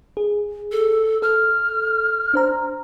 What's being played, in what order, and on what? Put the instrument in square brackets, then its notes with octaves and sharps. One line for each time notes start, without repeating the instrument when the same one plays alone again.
[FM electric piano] G#4
[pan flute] A4
[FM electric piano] A4 [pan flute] F6
[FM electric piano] D4 C5 A#5